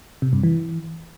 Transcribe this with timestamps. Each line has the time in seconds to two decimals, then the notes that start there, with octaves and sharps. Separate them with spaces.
0.22 C3
0.33 G2
0.44 E3